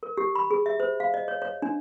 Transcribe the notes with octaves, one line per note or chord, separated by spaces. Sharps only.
A#4
G4
B5
G#4
E5
C5
F5
D#5
C#5
C#5
D4